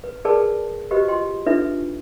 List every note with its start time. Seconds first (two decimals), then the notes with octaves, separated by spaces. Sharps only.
0.04 B4
0.25 G#4 A#4 B4 D5 G5 A5
0.91 F#4 G4 B4 C5 D#5
1.08 F4 D#5 G5 C6
1.46 D4 D#4 F4 A4 B4 E5